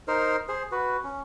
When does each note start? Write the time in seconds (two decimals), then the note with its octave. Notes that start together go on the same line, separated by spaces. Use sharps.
0.08 D#4 A#4 C5
0.49 G#4 C5
0.72 F#4 B4
1.04 C#4